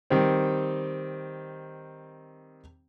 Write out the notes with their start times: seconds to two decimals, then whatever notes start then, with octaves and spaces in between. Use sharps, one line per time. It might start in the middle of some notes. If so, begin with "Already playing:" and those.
0.10 D#3 G3 C4